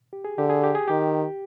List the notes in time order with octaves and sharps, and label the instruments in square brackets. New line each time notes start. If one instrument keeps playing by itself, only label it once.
[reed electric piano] G4
G#4
[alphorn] D3 [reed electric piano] G4
[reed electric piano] G#4
G4
G#4
[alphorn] D#3 [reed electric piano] G4